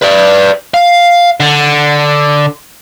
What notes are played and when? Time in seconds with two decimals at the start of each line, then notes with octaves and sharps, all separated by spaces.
0.02 B4 D5
0.74 F5
1.40 D3